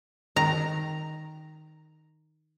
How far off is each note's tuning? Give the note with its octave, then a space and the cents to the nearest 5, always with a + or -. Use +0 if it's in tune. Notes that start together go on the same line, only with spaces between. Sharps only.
D#3 +0 A#5 +0